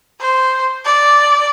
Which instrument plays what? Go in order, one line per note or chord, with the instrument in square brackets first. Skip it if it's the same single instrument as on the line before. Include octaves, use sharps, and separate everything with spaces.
[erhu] C5
D5